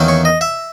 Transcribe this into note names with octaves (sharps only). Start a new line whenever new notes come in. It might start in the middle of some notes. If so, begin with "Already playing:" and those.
Already playing: E2 D#3 A#3 C#4
C#5
D#5
E5